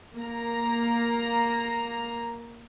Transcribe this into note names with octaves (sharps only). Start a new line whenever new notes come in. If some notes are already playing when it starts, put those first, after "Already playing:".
A#3 A#5